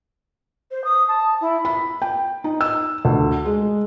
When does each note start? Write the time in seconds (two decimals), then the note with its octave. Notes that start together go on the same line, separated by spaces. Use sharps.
0.71 C5
0.84 D#6
1.08 A5
1.40 E4
1.65 B5
2.02 G5
2.44 D#4
2.61 E6
3.05 D2
3.46 G#3